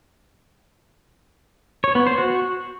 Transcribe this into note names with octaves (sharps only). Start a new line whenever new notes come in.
C#5
B3
C5
F#4